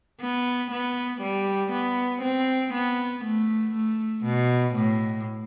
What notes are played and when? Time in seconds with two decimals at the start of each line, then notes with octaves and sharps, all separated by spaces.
0.21 B3
0.71 B3
1.21 G3
1.72 B3
2.22 C4
2.74 B3
3.24 A3
3.75 A3
4.25 B2
4.75 A2